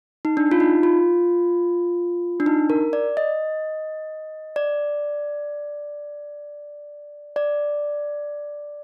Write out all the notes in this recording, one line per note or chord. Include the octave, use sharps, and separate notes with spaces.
D#4
D4
F4
D#4
F4
D4
D#4
A#4
D5
D#5
D5
D5